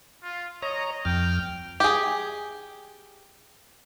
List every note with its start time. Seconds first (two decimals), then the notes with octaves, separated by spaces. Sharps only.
0.23 F4
0.62 C#5 D#5 A#5
1.05 F2 G5 F6
1.80 G4 G#4